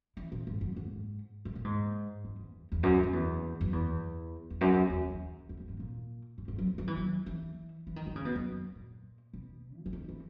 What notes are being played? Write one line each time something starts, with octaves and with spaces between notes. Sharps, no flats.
E3
A#2
G#2
F#2
G#2
G#2
A#2
G#2
F#2
E2
E2
F#2
F#2
E2
F#2
E2
E2
F#2
E2
E2
E2
F#2
G#2
A#2
G#2
G#2
F#3
F#3
E3
F#3
E3
E3
D#3
D#3
C#3
B2
F#2
A#2
B2
F#3
E3
D#3
E3